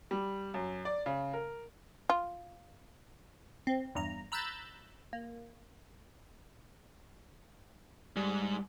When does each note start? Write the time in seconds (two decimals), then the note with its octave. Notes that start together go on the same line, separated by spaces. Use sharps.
0.11 G3
0.54 F#2
0.85 D5
1.06 C#3
1.33 A#4
2.10 F4
3.67 C4
3.95 E2 G2 A#5
4.32 A#5 B5 E6 F#6 G6 A6
5.13 A#3
8.16 G#2 G3